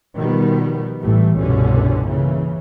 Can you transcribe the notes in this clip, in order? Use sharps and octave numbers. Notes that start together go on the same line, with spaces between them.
B2 D#3 F3 G3 B3
A1 A2 E3 G3 A3
G1 C2 B2 D3 C#4
A#2 C#3 E3